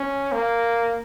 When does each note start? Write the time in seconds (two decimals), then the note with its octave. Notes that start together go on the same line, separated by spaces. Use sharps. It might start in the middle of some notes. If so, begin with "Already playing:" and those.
Already playing: C#4
0.32 A#3